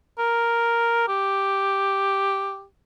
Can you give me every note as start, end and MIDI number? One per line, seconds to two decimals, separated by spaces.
0.19 1.04 70
1.08 2.64 67